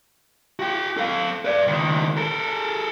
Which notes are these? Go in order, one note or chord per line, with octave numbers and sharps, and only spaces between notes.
F#4 G5
A4 F5
B4 D5
C#2 D#3
A4 A#4